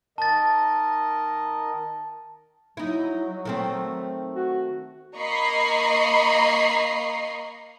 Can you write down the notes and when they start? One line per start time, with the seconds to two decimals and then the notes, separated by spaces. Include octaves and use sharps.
0.18 D#3 A#4 D#5 A5 A6
2.77 F#3 D#4 E4
3.45 D#3 A3 C4
4.35 F#4
5.16 A#3 D#5 A#5 B5 C#6 C7